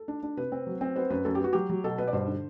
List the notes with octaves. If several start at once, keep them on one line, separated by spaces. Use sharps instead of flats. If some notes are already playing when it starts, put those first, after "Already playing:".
Already playing: A4
D4
D4
C3 B4
C4
F#3
C4
B3 C5
F#2 B4
F#2 A4
G4
B3 F#4
F#3 G4
F#3
B2 A4
B2 B4
D5
G2 C5
D3